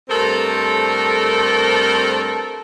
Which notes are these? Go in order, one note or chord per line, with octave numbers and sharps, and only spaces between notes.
G2 A3 C4 A4 A#4 C5